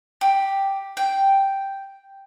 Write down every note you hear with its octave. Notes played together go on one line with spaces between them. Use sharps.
G4
G5